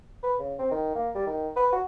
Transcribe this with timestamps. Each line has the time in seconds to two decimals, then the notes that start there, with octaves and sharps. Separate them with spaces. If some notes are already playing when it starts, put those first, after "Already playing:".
0.23 B4
0.40 C#3
0.59 C4
0.71 D#3
0.95 A#3
1.15 G3
1.27 D#3
1.56 B4
1.73 F#4